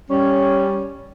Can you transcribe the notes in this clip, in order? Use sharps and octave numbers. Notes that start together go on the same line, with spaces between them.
G3 C#4